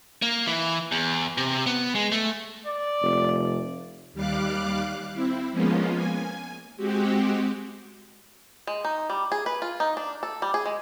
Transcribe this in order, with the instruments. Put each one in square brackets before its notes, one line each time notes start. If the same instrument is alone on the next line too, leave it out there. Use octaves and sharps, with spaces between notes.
[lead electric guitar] A#3
E3
E2
C3
B3
G#3
A3
[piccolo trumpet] D5
[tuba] F1
[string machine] D#2 G3 F5 D6 F#6
C4 E4
F3 G#3 A#3 B3 C#4 F4
G#5
G#3 C4 F#4 G4
[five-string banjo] G#3
D#4
G3
G#4
B4
F4
D#4
D4
A4
G3
G#4
G#3